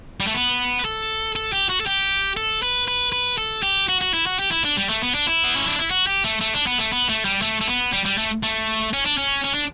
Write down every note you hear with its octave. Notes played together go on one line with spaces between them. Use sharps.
G3
A3
B3
B4
A4
A4
G4
F#4
A4
G4
A4
B4
B4
B4
A4
G4
F#4
F#4
E4
F#4
G4
E4
D4
G3
A3
B3
D4
E4
B3
C#4
D4
E4
F#4
G4
A3
A3
D4
B3
A3
B3
A3
G3
A3
A3
B3
G3
G3
A3
A3
C#4
D4
C#4
C#4
D4